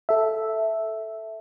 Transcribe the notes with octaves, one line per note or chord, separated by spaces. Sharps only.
A4 E5